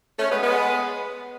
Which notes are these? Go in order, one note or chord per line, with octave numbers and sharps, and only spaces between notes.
A3 C#4
G#3 B3
G#3 B3